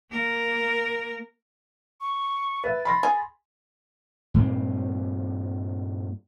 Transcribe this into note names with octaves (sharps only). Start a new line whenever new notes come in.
A#3 A#4
C#6
B4 E5 A6
B5 C6 A#6
G#4
G2 A#2 C4